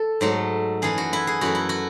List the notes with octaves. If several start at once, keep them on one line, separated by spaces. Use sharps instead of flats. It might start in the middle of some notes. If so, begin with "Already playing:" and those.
Already playing: A4
G#2 F#3 A3
F#2 E3 A3 G#4
F#4
E4
G#4
F#2 E3 A3 F#4
E4
F#4